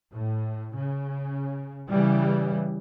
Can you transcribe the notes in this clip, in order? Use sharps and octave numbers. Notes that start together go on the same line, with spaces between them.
A2
C#3
C#3 E3 G3